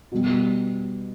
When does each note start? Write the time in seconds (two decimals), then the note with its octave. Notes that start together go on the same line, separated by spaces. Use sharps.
0.12 B2 G3